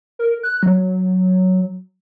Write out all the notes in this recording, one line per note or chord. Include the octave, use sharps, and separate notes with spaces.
A#4
F#6
F#3